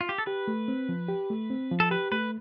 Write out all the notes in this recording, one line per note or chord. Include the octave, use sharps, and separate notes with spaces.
F4
G4
A4
G4 B4
A3
C4
F3
G4
A3
C4
F3
A4
G4 B4
A3 B4